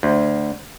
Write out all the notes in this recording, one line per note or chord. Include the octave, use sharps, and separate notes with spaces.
D2